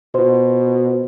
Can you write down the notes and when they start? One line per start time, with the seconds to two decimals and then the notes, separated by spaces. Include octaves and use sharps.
0.15 B2 F4 C5